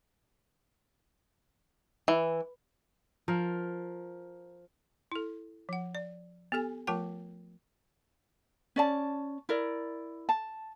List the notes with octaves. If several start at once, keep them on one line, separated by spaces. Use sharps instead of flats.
E3
F3 A#4
E4 A4
F3 F#5
D5
B3 G4 A4 G#5
F3 A3 F4 A#4 G5 A5
C#4 D5 A5
E4 A#4 D5
A5